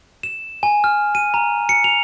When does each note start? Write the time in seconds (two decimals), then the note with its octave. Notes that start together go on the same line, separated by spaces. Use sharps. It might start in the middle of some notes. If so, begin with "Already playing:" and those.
0.23 E7
0.63 G#5
0.84 F6
1.15 D#7
1.34 A#5
1.69 C#7
1.84 F7